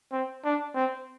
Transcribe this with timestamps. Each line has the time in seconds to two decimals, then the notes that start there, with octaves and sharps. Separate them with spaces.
0.12 C4
0.45 D4
0.75 C4